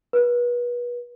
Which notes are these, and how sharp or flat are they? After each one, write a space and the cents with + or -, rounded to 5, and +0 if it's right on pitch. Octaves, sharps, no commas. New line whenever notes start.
B4 -35